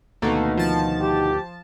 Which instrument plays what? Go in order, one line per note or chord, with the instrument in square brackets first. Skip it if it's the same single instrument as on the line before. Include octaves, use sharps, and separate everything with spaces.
[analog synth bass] D2 [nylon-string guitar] B2 D#3 [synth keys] A3 A#3
[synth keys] F3 A5
[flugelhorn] G4